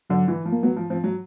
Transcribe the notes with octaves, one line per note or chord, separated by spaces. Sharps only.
D3 F#3
E3
F3
A#3
F#3 B3
F3
F3 C4
F#3